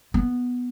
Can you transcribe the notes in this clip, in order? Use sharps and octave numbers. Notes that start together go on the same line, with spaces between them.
B3